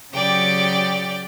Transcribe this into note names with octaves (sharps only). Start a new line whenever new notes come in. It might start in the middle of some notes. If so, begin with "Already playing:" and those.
C#3 F#3 G4 D5 G5